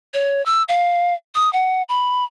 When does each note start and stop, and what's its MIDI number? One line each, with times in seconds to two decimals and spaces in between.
0.14 0.44 73
0.46 0.63 88
0.69 1.14 77
1.35 1.51 87
1.53 1.83 78
1.89 2.24 83